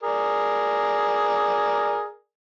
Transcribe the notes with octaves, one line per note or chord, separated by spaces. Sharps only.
G#4 A#4 D5